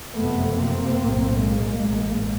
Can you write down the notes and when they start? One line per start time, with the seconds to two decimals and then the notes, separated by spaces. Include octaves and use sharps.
0.16 F#1 F2 C3 A3 B3
0.57 A#3 C4
1.00 B1 A2
1.42 G#3 A#3
1.84 A1 G#2